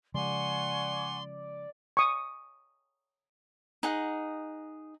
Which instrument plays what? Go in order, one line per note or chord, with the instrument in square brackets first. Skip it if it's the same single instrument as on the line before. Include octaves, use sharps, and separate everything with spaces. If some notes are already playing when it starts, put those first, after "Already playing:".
[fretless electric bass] C#3 F3 G#3 [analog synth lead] D5 [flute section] F#5 G#5 C#6 [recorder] C6
[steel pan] C#6 D#6
[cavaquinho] D#4 G#4 F#5